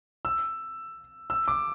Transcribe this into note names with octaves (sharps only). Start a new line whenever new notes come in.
E6
E6
D6